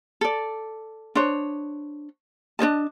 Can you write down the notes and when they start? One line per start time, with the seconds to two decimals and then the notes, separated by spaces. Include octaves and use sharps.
0.21 A4 D5
1.15 D4 C5 C#5
2.59 D4 C5 D#5 A5